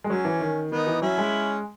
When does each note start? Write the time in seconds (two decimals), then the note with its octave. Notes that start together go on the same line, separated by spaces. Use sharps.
0.04 G#3
0.10 F#3 C#4
0.25 E3
0.41 D#3
0.71 D#3 B3 D#4
0.87 E3
1.02 F#3 C#4 E4
1.18 G#3